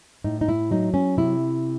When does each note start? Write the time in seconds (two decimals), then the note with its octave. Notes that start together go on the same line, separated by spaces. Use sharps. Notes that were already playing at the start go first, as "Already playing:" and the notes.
0.24 A2 D#4
0.41 D#4
0.49 E4
0.71 F#3 D#4
0.94 C#4
1.17 C3 E4